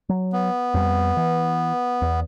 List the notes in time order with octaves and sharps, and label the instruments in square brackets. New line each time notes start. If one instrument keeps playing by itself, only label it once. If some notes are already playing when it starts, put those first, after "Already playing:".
[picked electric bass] F#3
[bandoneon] B3
[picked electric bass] F2 G3
E3
E2